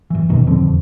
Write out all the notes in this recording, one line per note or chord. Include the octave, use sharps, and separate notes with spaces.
F#1 E3
D#1 B2 D#3
E1 F2 D3 C4